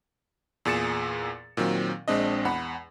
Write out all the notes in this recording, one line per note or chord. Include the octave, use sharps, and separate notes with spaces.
E2 A#2 G#4 A6 C#7 E7
A#2 D#3 F#3 C4
A#1 G#3 C4 D4 D#5
E2 F#5 B5